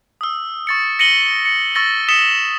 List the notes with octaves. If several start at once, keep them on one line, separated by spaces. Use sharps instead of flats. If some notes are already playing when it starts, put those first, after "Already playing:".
D#6 E6
C#6 A6 C#7
A#6 C#7 D#7 F#7 G7
C#7
C#6 E6 A6 A#6 F#7
D#6 A6 B6 C#7 E7 G7